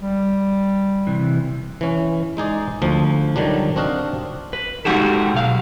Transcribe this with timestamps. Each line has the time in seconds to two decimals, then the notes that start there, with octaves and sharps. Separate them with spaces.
0.01 G3
1.07 C3 E3
1.81 E3 C#4
2.37 G#3 D#4 G#4 D5
2.82 D2 F3
3.36 D3 D#3 F#3 G3 D4
3.76 C4 D4 F#4 D#5 F5
4.53 B4
4.85 G#3 C4 D#4 F#4 G4 A4
5.34 B1 F5